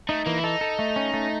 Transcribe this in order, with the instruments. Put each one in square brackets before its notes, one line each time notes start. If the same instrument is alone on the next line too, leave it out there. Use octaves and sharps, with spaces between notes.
[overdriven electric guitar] A3 [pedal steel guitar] D#4
[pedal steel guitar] E3 [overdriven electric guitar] A#3
[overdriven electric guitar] E4
[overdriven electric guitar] D#4 [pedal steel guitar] A4
[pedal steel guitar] A4
A3
C#4
A3